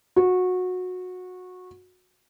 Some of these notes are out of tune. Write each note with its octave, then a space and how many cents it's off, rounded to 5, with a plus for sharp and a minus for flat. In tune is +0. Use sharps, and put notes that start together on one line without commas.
F#4 -20